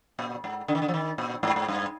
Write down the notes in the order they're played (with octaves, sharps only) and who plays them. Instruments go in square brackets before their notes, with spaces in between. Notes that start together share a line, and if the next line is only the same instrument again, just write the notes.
[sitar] A#2
G#2
D3
D#3
D3
F3
D#3
A#2
G#2
G#2
G2